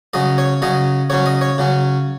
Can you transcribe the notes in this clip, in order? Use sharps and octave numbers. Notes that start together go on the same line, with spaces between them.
C#3 F#3 C#4 D#5
C#5
C#3 F#3 C#4 D#5
C#3 F#3 C#4 C#5
D#5
C#5
C#3 F#3 C#4